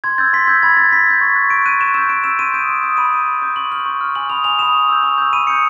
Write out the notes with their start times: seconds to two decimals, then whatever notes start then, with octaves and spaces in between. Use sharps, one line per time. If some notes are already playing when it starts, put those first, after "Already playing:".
0.04 C6 G#6
0.18 E6 G6 A6
0.33 C6 B6
0.47 E6 G6 G#6
0.63 B5 G#6
0.77 E6 G6 A6
0.92 B5 B6
1.07 E6 G6
1.21 C#6
1.36 F#6
1.50 C#6 D7
1.66 F#6 D#7
1.80 C#6 E7
1.94 E6 G6 E7
2.09 C#6 D7
2.24 E6 G6 E7
2.39 C6 D#7
2.53 D#6 G6 D7
2.68 C6
2.82 D#6 G6
2.97 B5 D#7
3.13 D6 G6
3.28 B5
3.42 D6 G6
3.56 C#6 F#7
3.71 F6 F#7
3.86 C#6
4.01 F6
4.15 G#5 F#7
4.29 B5 D#6 F7
4.44 G#5 F7
4.59 B5 D#6 E7
4.75 C#6
4.89 E6 G6
5.03 C#6
5.18 E6 G6
5.33 B5 D#7
5.47 D#6 G6 C#7